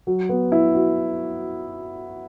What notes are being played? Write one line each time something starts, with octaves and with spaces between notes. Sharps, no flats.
F#3
B3
E4
F#4